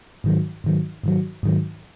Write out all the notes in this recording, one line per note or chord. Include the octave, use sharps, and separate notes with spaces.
G#2 D#3 F#3
G#2 D#3 F#3
G#2 D#3 F#3
G#2 D#3 F#3